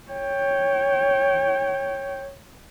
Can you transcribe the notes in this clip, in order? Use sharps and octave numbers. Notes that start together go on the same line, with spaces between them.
C#5 G5